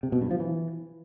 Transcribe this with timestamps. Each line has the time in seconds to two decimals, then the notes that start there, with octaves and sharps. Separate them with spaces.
0.03 C3
0.12 B2
0.22 G2
0.31 F3
0.40 E3